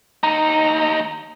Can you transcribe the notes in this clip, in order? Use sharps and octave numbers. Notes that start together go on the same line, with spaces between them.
D#2 D#4 A#5